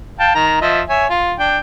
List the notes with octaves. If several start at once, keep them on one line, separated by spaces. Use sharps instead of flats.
F5 G5 A5
D#3 A#5
F3 D#5 E5
C#5 E5 G#5
F4
D4 G5